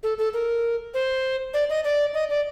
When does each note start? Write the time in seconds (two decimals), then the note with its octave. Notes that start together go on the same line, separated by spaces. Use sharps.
0.03 A4
0.18 A4
0.34 A#4
0.94 C5
1.54 D5
1.70 D#5
1.85 D5
2.14 D#5
2.30 D5